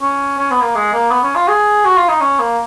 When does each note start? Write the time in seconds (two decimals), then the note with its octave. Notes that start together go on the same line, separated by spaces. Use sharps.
0.01 C#4
0.38 C#4
0.51 B3
0.62 A#3
0.75 G#3
0.93 A#3
1.11 B3
1.23 C#4
1.35 F4
1.48 G#4
1.85 F#4
1.97 F4
2.08 D#4
2.21 C#4
2.39 A#3